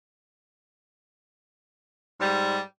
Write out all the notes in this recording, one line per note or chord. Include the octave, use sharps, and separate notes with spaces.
G#2 G3